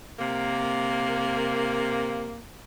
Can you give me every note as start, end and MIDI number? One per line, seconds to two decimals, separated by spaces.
0.19 2.41 48
0.19 2.41 58